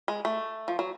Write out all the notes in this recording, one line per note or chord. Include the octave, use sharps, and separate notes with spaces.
G#3
A3
F3
F#3